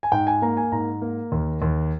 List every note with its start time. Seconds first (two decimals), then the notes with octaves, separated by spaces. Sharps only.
0.03 G#5
0.12 G#2 G5
0.27 G#5
0.42 A#3 A#5
0.57 G#5
0.72 G#2 A#5
1.02 A#3
1.32 D#2
1.62 D#2